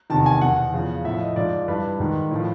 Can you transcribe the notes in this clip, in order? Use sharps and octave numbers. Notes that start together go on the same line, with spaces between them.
E2 C3 D#3 A5
G#5
E2 B2 F#5
E2 C#3 F3
A2 F3 E5
D#5
G#2 F3 D5
G2 E3 B4
G#2 D#3
A2 F3